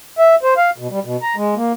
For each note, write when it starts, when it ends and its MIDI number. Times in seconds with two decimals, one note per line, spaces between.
0.18 0.35 76
0.43 0.54 72
0.57 0.70 77
0.78 0.88 47
0.91 1.00 55
1.05 1.16 47
1.22 1.35 82
1.36 1.55 56
1.56 1.72 58